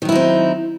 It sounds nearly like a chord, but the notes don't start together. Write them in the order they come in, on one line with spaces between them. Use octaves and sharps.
D#3 F#3 E4 D#4 C4